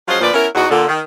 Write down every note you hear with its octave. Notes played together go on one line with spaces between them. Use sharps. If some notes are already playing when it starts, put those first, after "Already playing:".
F3 F#3 G#3 C#4 F4 C5
D2 A#2 F3 B4 D5
B3 C#4 E4 A#4
E2 D#4 F#4
A#2 D3
D#3